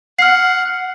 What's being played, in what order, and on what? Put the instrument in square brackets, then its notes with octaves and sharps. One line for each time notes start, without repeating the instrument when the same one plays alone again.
[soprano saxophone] F#5 [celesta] F6 C7